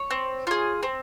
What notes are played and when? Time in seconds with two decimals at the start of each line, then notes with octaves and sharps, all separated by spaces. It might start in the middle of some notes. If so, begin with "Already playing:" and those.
Already playing: C#5
0.11 C4
0.47 F4 G#4
0.83 C4